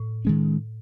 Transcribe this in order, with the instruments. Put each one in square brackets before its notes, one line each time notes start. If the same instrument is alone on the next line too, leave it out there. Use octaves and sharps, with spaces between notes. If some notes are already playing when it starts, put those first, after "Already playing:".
Already playing: [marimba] A2
[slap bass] D#3 G#3 C#4